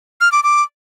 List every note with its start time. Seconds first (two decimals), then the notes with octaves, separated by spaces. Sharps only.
0.21 F6
0.32 D6
0.43 D6